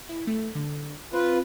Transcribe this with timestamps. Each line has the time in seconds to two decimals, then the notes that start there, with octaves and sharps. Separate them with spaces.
0.09 E4
0.27 A3
0.55 D3
1.13 C4 F4 B4